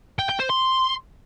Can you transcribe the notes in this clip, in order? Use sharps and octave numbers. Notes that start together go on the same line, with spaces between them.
G5
G5
C5
C6